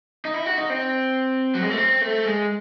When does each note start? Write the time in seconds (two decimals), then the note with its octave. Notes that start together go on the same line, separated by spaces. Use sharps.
0.25 D#4
0.34 E4
0.46 F#4
0.58 D#4
0.70 C4
1.55 F#3
1.62 G#3
1.70 A3
1.77 C4
2.02 A3
2.26 G#3